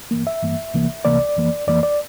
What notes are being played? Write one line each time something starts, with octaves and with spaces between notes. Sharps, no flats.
G2 E3 A#3
E5
G2 E3 A#3
C2 C3 E3 A#3
C2 C3 E3 A#3 D5
F2 E3 A#3
F2 E3 A#3 D5
D5